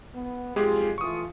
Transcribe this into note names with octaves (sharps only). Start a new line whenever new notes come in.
B3
B1 F2 G#3 F4 G4 G#4
E3 A3 F4 C#6 D#6